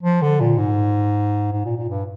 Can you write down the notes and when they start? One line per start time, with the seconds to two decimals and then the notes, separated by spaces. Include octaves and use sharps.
0.03 F3
0.22 D3
0.40 A#2
0.58 G#2
1.52 G#2
1.65 A#2
1.77 A#2
1.90 G2